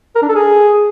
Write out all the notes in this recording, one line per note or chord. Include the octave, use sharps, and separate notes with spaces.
A#4
D4
A4
G#4